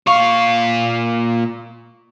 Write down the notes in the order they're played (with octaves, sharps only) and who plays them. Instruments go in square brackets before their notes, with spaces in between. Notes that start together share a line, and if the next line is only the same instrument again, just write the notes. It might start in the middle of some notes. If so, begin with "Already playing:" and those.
[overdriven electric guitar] A#2 F5 [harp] C#6